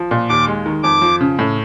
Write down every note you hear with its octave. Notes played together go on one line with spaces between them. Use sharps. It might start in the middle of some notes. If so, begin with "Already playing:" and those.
Already playing: F3
A#2
D#2 D6
G#3
D#3
F2 D6
F3
C#3
A2